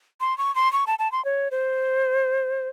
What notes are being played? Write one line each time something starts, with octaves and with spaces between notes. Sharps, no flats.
C6
C#6
C6
C#6
A5
A5
C6
C#5
C5